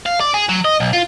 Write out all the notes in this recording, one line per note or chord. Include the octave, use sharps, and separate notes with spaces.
F5
D5
G#4
F#3
D#5
B1
F4